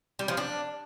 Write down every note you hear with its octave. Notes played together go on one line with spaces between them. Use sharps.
G3
F3
D4